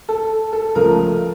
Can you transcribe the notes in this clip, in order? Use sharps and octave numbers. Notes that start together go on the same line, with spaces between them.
A4
A4
C#2 C#3 F3 A3 A#4